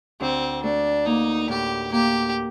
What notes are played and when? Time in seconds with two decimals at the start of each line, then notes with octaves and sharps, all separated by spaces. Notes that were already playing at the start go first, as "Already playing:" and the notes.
0.20 D2 C4
0.63 A3 D4
1.06 A#3 D#4
1.49 A2 G4
1.92 A#3 G4